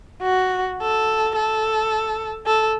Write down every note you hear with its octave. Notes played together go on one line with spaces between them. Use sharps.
F#4
A4
A4
A4